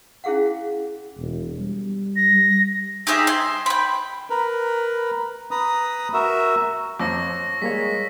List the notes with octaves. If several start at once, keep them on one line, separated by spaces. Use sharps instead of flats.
C#4 E4 G#4 F5 F#5
E1
G3
A#6
D#4 G4 G#4 E5
C6
G5 B5
A#4 B4
B4 A#5 D#6
F#4 A#4 E5
F2 C5 C#5 C#6 D6 E6 A#6
G3 G#3 A#3 C#5 B6